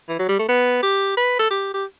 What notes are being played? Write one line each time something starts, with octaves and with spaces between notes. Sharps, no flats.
E3
F#3
G3
A3
B3
G4
B4
A4
G4
G4